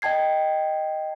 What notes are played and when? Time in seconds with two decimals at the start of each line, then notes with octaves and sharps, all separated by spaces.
0.02 D#5 G5 A5 G#6 C7